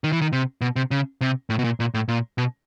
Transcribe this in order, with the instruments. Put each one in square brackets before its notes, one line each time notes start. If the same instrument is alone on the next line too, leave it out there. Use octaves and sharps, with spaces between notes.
[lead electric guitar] D#3
E3
D#3
C3
B2
C3
C#3
C3
A2
B2
A#2
A#2
A2
A#2
B2